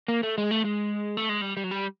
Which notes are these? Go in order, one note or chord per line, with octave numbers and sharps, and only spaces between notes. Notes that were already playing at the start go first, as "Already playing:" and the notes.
A#3
A3
G#3
A3
G#3
A3
G#3
G3
G3
F#3
G3